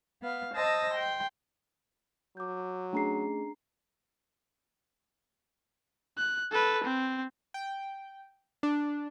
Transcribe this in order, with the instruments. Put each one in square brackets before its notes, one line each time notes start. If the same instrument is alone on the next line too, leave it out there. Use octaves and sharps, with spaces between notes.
[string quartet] B3 F5
C5 D#5 A5 D#6 E6 A#6
G5 C6
[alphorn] F#3 [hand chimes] D6 G6
[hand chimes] A3 C#4 G#4 [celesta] D4 A#5 C7
[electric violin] F#6
A4 B4
C4
[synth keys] G5
D4